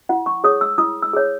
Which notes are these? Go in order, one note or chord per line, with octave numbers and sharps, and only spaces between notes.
E4 F#5
C#6
G#4 C#5 D#6
E6
E4 D#6
E6
G#4 C#5